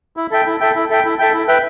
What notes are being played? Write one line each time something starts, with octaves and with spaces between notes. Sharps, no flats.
E4
A4 E5 G5
E4
A4 E5 G5
E4
A4 E5 G5
E4
A4 E5 G5
E4
B4 E5 G5